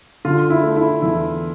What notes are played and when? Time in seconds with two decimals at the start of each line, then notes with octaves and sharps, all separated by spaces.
0.25 D3 F4
0.50 E4
0.63 A3
0.76 E4
1.02 E2 E4